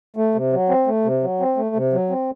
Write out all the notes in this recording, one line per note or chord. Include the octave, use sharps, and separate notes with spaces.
A3
C3
F#3
C4
A3
C3
F#3
C4
A3
C3
F#3
C4